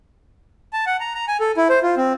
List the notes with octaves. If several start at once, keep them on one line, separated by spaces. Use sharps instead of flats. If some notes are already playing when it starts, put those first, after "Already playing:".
A5
F#5
A#5
A#5
G#5
A4
E4
C5
F4
C4